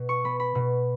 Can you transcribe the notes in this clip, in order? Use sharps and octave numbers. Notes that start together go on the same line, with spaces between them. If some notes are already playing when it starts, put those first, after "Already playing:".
Already playing: B2
C#6
B3 B5
B5
B2